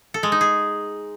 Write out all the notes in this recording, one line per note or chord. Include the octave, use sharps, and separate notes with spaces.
A4
G#3
D#4
G#4